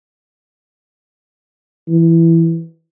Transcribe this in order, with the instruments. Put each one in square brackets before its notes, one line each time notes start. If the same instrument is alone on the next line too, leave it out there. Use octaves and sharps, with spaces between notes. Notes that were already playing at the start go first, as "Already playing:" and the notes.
[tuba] E3